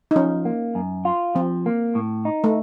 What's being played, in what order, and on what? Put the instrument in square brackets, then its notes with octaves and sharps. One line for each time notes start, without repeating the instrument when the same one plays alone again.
[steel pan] D#4
[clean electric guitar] F3 [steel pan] C#4
[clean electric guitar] A#3
F#2
F4
[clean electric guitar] F3 [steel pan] C4
[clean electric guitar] A#3
A2
D#4
[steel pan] A3